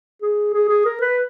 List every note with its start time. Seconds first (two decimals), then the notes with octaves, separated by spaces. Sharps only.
0.22 G#4
0.54 G#4
0.69 G#4
0.86 A#4
1.01 B4